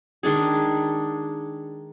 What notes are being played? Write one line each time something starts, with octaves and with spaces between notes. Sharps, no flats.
D#3 G#3 D4 G#4